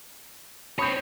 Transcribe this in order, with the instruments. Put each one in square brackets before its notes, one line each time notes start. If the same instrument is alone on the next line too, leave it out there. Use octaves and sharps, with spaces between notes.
[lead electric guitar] C4 C#5 [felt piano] B5 D#6 G6